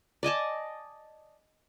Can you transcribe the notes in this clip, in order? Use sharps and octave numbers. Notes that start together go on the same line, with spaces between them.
D5 D#5 G#5 A5